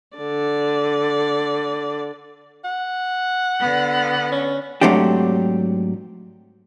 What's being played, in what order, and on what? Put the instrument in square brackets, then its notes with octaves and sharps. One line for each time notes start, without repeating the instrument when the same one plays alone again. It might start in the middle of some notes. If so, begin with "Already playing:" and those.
[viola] D3 D5
[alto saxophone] F#5
[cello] D3 B3
[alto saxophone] C#4
[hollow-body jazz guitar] G#2 F#3 A3 C4 D4 G4